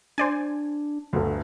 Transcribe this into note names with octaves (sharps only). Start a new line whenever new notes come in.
D4 C5 D5 G#5
G1 D2